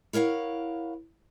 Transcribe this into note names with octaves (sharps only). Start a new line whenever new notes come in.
E4 A#4 C#5 F5 F#5